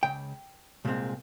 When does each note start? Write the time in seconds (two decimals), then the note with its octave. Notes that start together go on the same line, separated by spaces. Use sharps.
0.03 C#2 C#3 G5
0.85 C2 A#2 G#3 C4